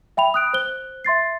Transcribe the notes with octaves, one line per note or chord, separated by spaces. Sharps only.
E5 G5 B5 F7
D#6 F#6 D7
C5 F#6 G7
E5 C6 A6 C7